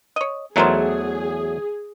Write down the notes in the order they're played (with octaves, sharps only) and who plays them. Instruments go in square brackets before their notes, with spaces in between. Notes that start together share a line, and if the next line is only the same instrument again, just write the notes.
[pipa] C#5 D#5
[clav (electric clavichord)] E2 F#3 A3 [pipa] D#4 A#4 C5 [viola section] G#4